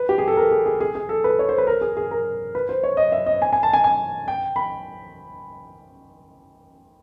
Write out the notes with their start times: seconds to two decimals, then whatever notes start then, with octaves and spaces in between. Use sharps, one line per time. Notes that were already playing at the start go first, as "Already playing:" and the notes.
Already playing: B4
0.09 G4
0.18 G#4
0.28 A4
0.37 A#4
0.51 G#4
0.66 G#4
0.81 G#4
0.95 G#4
1.09 A4
1.24 B4
1.39 C#5
1.49 C5
1.58 B4
1.67 A#4
1.81 G#4
1.97 G#4
2.11 A#4
2.55 B4
2.69 C5
2.84 C#5
2.97 D#5
3.12 E5
3.26 D#5
3.42 G#5
3.53 G#5
3.63 A5
3.73 G#5
3.84 G#5
4.28 G5
4.56 B5